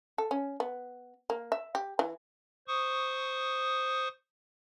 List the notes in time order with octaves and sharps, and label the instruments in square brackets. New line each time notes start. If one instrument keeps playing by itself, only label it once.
[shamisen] A4
C#4
B3
A#3
E5
G4
E3
[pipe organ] C5 C#6 D#6